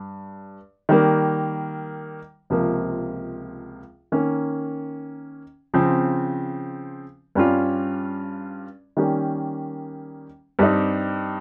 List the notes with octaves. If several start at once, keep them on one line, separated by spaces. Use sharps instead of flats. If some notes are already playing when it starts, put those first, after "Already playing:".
Already playing: G2
D#3 G3 A#3
C#2 C3 F3 A#3
D#3 A#3 C#4
C#3 F3 C4
G2 G3 C#4 F4
D#3 G3 A#3 C#4 G4
G2 G3 C4 D#4